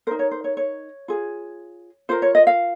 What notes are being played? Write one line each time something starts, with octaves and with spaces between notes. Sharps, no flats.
D#4 A#4 C5
C#5
C5
C#5
C#5
F4 G#4
F4 A#4 C5
C#5
D#5
F5